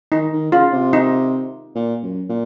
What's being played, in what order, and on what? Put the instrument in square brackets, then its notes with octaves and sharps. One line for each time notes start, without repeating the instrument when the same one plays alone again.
[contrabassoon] D#3 [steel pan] D#4
[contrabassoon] D#3
[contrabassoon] C#3 [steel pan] F4
[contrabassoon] C3
[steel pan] D#4
[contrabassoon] A#2
F#2
A#2